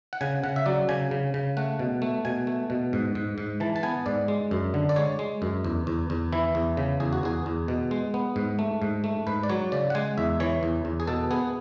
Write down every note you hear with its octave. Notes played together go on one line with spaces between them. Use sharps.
F#5
C#3 G#5
C#3 F#5
E5
F#3 D5
C#3 G#5
C#3
C#3
A3 F#5
B2
A3
B2 G#5
A3
B2
G#2
G#2
G#2
E3 A5
A5
B3 G#5
G#2 D5
G#3
F#2
D3
D5
G#3 C#5
G#3
F#2
E2
E2
E2
E3 E4
E2
C#3
E2 G#4
F#4
E2 G#4
E2
B2
G#3
B3
G#2
A3
G#2
A3
G#2 B4
D5
F#3 C#5
C#3 D5
F#5
G#3 G#5
E2 E5
E3 C#5
E2
E2
G#4
B2 A4
B3 G#4